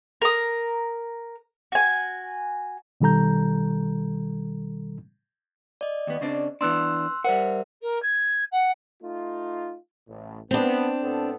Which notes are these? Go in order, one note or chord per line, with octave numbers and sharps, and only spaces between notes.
A#4 D#6
F#4 G#5
B2 D#3 G3 A4 A#5 G6
D5 D#5
D#2 B3
C#3 C4 D4
E3 B3 D4 C6 E6 F#6
G3 A#4 C5 E5 F#5
A#4
G#6
F#5
A3 D#4 F4
A1 A2
B3 C4 D4
A2 B3 A4